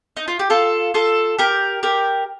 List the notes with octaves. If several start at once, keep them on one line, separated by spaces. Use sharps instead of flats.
D#4
F4
G4
F4 A4
F4 A4
G4 A#4
G4 A#4